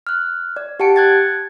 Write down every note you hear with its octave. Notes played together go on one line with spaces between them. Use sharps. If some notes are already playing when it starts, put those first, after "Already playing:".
F6 F#6
D5
G4 F#5 A5 C#7 D7
F#6 G#6 A6